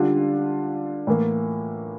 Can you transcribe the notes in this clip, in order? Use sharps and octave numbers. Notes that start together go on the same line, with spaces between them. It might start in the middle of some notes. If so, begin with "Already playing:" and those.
Already playing: D3 G3 D4 F4
A2 E3 A#3